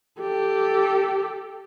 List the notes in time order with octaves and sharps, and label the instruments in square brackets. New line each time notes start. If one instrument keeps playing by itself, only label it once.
[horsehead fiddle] G4 A4